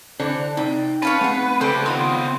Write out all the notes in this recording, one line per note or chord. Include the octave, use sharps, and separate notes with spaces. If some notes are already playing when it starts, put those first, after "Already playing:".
D3 E3 D4 C5
C3 D#4 D5 G5
C#4 B4 C#5 F5 A5
A3 B3 C4 G#4 C5 F#5
C#3 G4 A4 B4 C5 D5
D#3 B3 C4 F4 D#5